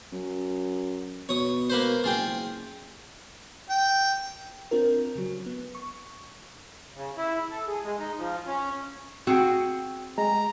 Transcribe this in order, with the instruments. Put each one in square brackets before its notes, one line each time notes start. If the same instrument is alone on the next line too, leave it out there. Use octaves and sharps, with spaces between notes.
[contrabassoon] F#2
[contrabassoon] B2 [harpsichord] C#5 D#6
[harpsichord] A#3 B4 C5
[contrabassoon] F#1 [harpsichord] F4 G#4 G5
[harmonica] G5
[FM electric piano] C4 D4 F4 A#4
C#3 F#3
B3
C#6
[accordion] C#3
E4
A4
G#4
G#3
D#4
F3
C#4
[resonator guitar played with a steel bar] C4 G#4 G5 [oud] F#4
[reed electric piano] G#3 [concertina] A#5